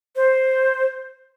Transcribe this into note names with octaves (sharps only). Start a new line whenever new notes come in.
C5